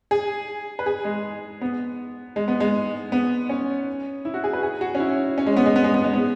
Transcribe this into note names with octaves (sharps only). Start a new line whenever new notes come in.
G#4
B4
G#4
G#3
B3
G#3
B3
G#3
B3
C#4
E4
F#4
G#4
B4
G#4
F#4
C#4
E4
C#4
G#3
B3
G#3
B3
G#3
B3
G#3
B3